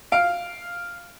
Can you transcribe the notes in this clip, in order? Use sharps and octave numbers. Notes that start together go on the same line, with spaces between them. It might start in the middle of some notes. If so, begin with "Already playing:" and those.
F5 D7